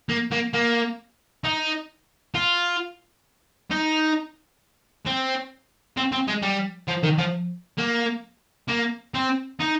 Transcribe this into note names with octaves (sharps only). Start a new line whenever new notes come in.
A#3
A#3
A#3
D#4
F4
D#4
C4
C4
C4
G#3
G3
F3
D#3
F3
A#3
A#3
C4
D#4